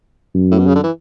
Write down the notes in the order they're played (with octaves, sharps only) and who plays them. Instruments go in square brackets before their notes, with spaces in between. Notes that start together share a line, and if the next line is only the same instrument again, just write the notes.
[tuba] F#2
[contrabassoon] A2
B2
C#3
D3
E3